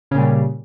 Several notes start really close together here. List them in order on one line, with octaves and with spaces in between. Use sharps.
C#3 A#2 G3